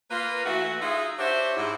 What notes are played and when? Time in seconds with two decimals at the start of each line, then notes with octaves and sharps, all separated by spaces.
0.11 A#3 F4 B4
0.46 E3 A3 F#4
0.80 G#3 D#4 F4 G#4 E5
1.18 D4 F#4 G4 C5 C#5 E5
1.57 G#2 E4